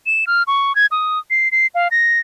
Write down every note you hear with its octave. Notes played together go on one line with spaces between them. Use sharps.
E7
F6
C#6
G#6
D#6
C7
C7
F5
A#6